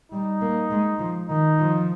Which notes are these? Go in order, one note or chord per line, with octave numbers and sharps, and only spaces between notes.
G3 D#4
A#3
G#3
F3
D#3 D#4
F3